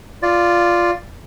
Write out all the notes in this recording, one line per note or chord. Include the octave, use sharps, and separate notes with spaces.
F4 D5